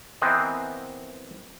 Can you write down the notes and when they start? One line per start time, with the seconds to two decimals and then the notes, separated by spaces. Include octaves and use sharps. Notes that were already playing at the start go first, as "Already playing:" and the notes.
0.21 E3 B3 C4 A#4 C5 D#5